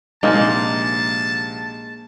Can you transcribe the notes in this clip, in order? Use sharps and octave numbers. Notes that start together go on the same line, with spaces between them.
A#1 C3 G#3 A#3 D#4 A5